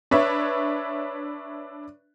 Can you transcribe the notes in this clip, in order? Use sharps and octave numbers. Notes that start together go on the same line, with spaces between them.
D4 B4 C#5 E5